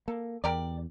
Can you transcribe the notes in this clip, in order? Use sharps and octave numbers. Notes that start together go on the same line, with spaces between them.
A#3 A4
E2 G4 A#4 D5